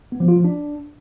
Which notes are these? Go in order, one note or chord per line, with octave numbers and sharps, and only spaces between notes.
B3
F3
F4
F3
D4